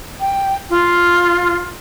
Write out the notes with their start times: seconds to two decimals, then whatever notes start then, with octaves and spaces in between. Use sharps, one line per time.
0.20 G5
0.70 F4